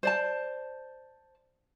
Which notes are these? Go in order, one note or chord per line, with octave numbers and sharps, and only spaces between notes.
C5 D5 A5